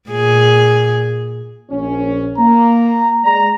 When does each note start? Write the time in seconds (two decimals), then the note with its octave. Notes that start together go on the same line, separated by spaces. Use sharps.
0.10 A#2 G#4
1.70 A#1 C#4
2.38 A#3 A#5
3.24 G#3 D5 A#5